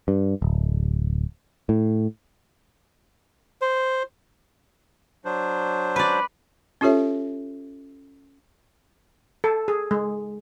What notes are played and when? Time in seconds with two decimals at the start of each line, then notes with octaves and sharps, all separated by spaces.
0.08 G2
0.42 D1
1.69 A2
3.61 C5
5.25 F#3 D4 C5
5.96 B4 D5
6.81 C#4 F4 G4 A4 C#5 E5
9.44 A4
9.68 G#4
9.91 G#3